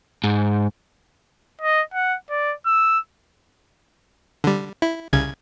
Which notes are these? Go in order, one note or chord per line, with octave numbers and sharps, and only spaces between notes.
G#2
D#5
F#5
D5
E6
D3 G3
E4
C2 C#3 G#6